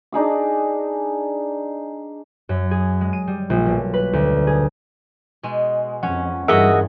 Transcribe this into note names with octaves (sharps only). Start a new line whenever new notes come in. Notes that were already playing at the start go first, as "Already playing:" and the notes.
D4 D#4 G#4 D6
F#2
G#4
G#3
D#7
G3
A#1
B1
B4
D2
G#4
B2 G#3
F2 C#4 C#5 F#5
G2 E3 F#4 G#4 A#4 D#5 E5 F#5